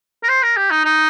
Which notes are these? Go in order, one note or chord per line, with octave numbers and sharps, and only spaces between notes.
A#4
C5
A#4
G4
D#4
D#4